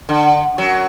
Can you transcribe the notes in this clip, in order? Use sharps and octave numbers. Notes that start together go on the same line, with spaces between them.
D3
F#2 F#3